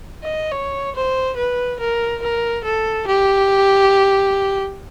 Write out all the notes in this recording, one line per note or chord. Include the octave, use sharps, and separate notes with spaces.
D#5
C#5
C5
B4
A#4
A#4
A4
G4